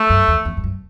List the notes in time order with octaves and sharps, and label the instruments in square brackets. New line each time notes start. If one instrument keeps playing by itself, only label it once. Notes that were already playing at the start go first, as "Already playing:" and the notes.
Already playing: [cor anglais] A3
[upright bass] F#2
E2
E2
G2
F#2